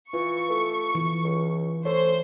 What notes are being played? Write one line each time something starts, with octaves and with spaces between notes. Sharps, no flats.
E3 F4 C#6
A3
E3
C#2
A3 C5 C#5